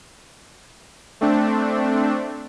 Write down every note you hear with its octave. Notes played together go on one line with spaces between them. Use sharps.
A3 C4 D4